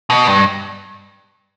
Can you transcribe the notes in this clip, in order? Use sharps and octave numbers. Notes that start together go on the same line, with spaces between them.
B2
G2